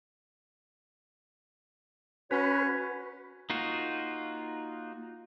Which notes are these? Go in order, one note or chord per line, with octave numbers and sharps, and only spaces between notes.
C#4 F#4 B4 C#5
A#3 D#4 F4 F#4